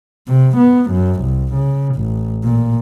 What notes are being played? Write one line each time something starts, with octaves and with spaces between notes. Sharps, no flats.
C3
B3
F#2
C2
C#3
A1
A#2